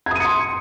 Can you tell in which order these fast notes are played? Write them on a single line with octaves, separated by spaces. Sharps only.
G#6 D#6 D#7 C#7 C6